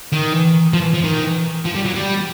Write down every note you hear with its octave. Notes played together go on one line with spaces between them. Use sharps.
D#3
F3
F3
D#3
F3
G3
F#3
G3